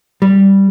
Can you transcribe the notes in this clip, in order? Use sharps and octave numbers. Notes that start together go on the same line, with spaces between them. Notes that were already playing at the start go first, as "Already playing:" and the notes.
G3